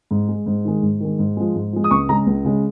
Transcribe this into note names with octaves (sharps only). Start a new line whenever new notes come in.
G#2
G#3
G#2
D#3 G#3
G#2
D#3 G#3
G#2
F3 G#3
G#2
F3 G#3
D#6
C#2 C#6
C#3 G#3 A#5
C#2
C#3 G#3